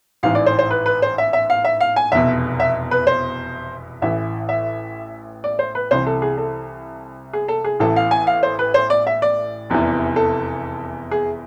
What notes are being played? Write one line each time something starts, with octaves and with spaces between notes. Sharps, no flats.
A1 G#2 E3 F5
D5
C5
C5
B4
B4
C5
E5
E5
F5
E5
F5
G#5
F1 E2 B2 E5
E5
B4
C5
A1 A2 E3 E5
E5
D5
C5
B4
C2 C3 E3 C5
A4
G#4
A4
G#4
A4
G#4
A1 A2 E3 A4
F5
G#5
F5
C5
B4
C5
D5
E5
D5
F1 E2 C3 E3
A4
G#4